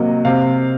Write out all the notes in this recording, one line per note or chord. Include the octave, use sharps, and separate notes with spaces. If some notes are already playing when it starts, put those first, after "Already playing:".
Already playing: C3 F#3 A#3 D#5
C3 F5